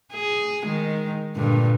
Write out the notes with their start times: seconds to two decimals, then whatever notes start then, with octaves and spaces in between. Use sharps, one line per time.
0.13 G#4
0.65 D#3 G#3
1.36 G2 A#2 D3